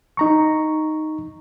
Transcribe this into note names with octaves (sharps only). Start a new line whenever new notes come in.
D#4 A#5 C#6